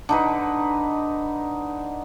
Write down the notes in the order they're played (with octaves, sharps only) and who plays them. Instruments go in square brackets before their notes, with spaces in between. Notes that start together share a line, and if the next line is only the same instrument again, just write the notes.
[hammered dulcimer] D3 D#4 B4